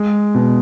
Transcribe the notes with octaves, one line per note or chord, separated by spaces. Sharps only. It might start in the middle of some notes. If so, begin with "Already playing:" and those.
Already playing: G#3
B2